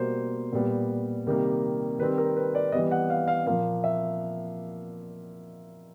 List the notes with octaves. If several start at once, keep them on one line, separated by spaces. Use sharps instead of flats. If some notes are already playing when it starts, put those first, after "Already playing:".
Already playing: B2 G3 A#3 C5
A#2 G3 B3
C3 D#3 G3 A#3
D#3 G3 C4 B4
A#4
B4
D5
E3 G3 B3 D#5
F#5
F5
F5
A#2 F3 A#3 F5
E5